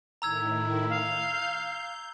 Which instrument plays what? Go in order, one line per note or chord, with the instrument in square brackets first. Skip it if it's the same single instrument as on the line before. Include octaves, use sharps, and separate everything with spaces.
[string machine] A2 D#3 E4 [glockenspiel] A#5 E6 G#6
[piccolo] F5 [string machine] G6